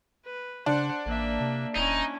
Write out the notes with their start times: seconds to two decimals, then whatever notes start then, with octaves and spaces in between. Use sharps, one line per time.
0.24 B4
0.66 C#3 D4 C5 F#5
1.06 A1 A#3 E5
1.40 C3
1.75 D#1 C#4 D#4 E4